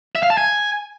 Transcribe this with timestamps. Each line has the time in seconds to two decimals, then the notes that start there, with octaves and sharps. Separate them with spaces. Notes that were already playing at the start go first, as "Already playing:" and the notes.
0.15 E5
0.23 F5
0.30 A5
0.37 G#5